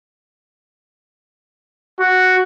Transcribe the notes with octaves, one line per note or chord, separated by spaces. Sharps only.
F#4